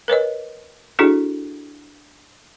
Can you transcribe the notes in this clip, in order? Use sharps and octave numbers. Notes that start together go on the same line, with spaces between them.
A#4 B4 C#5 D#5
D4 E4 F#4 G#4 A4